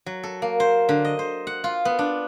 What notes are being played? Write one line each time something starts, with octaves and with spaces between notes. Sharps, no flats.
F#3
A4
A#3
C5
D3
D#5
C5
F#5
F4
B3
D4